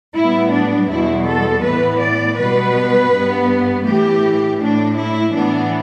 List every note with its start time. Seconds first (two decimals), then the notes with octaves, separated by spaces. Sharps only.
0.17 A2 G3 B3 E4
0.54 D4
0.91 E2 B2 G3 E4
1.28 A4
1.64 A2 E3 B3 B4
2.01 D5
2.38 B2 G3 B3 B4
3.12 G2 G3 B3
3.86 A2 E3 A3 G4
4.59 A2 A3 D4
4.97 E4
5.33 A2 E3 B3 D4